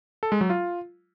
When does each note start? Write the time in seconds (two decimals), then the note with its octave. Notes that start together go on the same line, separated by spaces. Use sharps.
0.23 A4
0.32 G#3
0.41 F#3
0.50 F4